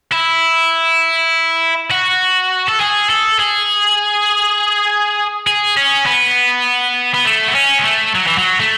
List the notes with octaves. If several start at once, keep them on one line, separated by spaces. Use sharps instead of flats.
E4
F#4
A4
G#4
A4
G#4
G#4
C#4
B3
B3
A3
B3
C#4
G#3
A3
F#3
E3
F#3
A3